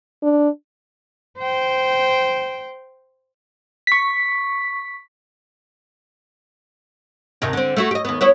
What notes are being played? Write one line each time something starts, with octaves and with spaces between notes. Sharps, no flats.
D4
C5 G5
C#6 B6
D#2 C3 D#3
D3 C4
A3 E4 F#4
G4 D#5
D#2 B3
B3 E4 C#5